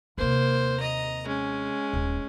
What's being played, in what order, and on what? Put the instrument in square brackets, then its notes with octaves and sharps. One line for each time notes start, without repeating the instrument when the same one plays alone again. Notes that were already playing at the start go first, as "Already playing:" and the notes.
[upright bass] D#2 C3 [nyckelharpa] A#3 C5
[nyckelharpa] D#5 A#5
G#3 C#4
[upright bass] D#1